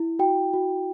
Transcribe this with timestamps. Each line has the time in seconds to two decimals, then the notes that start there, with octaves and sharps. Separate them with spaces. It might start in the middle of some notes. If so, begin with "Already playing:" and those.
Already playing: E4
0.19 F#4 G5
0.53 F#4